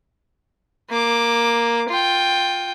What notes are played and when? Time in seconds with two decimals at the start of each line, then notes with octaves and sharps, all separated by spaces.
0.90 A#3 D6
1.89 F4 G5